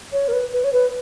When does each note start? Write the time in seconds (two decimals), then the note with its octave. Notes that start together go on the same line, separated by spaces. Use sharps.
0.12 C#5
0.28 A#4
0.33 B4
0.53 B4
0.64 C#5
0.73 B4